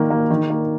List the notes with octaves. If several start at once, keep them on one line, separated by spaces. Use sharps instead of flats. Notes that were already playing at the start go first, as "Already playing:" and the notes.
Already playing: D#3 A#3
A#3
D#3
A#3